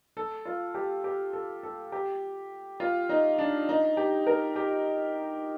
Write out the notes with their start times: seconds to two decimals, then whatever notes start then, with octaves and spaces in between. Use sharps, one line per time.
0.17 A4
0.45 F4
0.74 G4
1.04 G4
1.33 A4
1.63 A4
1.92 G4
2.80 F4
3.09 D#4
3.38 D4
3.69 D#4
3.97 G4
4.27 A#4
4.56 G4